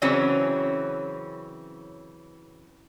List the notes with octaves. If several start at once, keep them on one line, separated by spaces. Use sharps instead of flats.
C#3 E3 F#3 C4 C#4